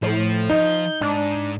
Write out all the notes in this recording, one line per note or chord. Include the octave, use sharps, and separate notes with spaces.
A2 F3
D#4 G6
G#2 D4